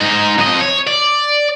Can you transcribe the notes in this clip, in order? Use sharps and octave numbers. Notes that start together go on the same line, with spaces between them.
G#2 D#4
F2 D#5
C#5
D5